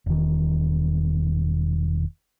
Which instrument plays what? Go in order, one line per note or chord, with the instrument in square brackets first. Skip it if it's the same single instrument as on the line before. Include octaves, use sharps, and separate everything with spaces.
[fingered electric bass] E1 D#3